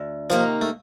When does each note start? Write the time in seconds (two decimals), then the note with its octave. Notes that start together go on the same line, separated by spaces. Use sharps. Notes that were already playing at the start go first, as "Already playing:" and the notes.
Already playing: D2
0.30 C3 D#3 F3 A#3 D#4
0.62 A3